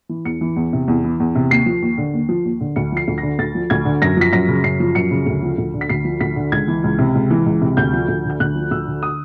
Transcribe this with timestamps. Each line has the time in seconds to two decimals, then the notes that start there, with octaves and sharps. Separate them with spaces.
0.09 E3
0.25 E2 C#7
0.41 E3
0.56 E2
0.73 C3
0.88 E2
1.04 E3
1.20 E2
1.35 C3
1.50 D#2 C7
1.66 F3
1.82 D#2
1.98 D3
2.13 D#2
2.29 F3
2.45 D#2
2.61 D3
2.76 D2 C#7
2.92 F3 C7
3.08 D2
3.18 A#6
3.23 D3
3.39 D2 A6
3.55 F3
3.70 D2 G#6
3.85 D3
4.02 F#2 A#6
4.17 F3 B6
4.33 F#2 A#6
4.48 C#3
4.64 F#2 C7
4.80 F3
4.95 F#2 C#7
5.11 C#3
5.26 D2
5.42 F3
5.58 D2
5.74 D3
5.81 B6
5.89 D2 C7
6.05 F3
6.21 D2 B6
6.36 D3
6.52 C#2 G#6
6.68 E3
6.84 C#2
6.99 C3
7.15 C#2
7.30 E3
7.46 C#2
7.61 C3
7.77 D2 G6
7.93 F3
8.08 D2
8.25 D3 G6
8.40 D2 F#6
8.55 F3
8.71 D2 E6
8.87 D3
9.03 D#6